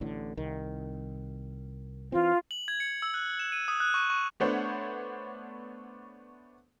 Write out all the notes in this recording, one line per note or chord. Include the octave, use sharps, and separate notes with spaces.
A1 A2 D3
C2 D#3
E3 C4 F4
F#7
G#6
C#7
E6
F#6
E7
D#7
D#6
F#6
C#6
C#6
A3 B3 D4 C5 C#5 F#5